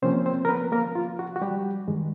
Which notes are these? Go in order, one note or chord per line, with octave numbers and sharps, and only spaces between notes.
C3 F3 A#3 C4 C#4 C5
C4 C5
A#4
B3 B4
A#3 A#4
F4
F#4
F#4
G3 G4
G2 D#3 G#3